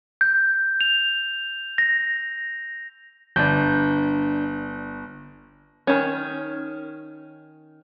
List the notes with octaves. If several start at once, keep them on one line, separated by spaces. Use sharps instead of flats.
G6
F7
A#6
G1 D4 G6
D#3 C#4